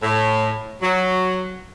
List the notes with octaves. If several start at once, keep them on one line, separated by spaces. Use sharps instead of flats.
A2
F#3